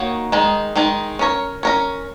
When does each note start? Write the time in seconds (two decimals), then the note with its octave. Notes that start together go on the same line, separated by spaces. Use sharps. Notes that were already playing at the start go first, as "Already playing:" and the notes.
Already playing: D#3 A#3 D#4 F#4 C#5
0.32 D#3 G#3 D#4 G#4
0.76 D#3 G#3 D#4 G#4
1.19 C#4 A#4 C#5
1.63 C#4 A#4 C#5